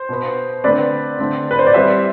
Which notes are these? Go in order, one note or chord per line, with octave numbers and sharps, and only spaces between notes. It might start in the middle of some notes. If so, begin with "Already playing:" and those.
Already playing: C5
B2 B3
D3 A3 C4 B4 D5
D3 A3 C4
B4
C5
D5
E3 G3 C4 C5 E5